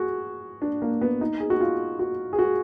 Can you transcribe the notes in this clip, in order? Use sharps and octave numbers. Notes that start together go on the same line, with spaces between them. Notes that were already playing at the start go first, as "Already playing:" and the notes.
Already playing: F#4 G#4
D4
A#3
B3
D#4
G#4
F#4
F4
F#4
G#4
F#4